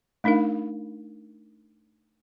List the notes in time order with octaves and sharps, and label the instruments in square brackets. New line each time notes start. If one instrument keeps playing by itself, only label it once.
[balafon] A3 D4 D#4 A#4 F5